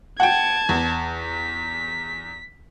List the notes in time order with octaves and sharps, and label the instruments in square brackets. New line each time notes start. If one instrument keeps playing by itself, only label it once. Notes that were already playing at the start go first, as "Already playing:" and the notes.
[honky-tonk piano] F#5 G5 [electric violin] A5 G#6
[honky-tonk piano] E2
[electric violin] B6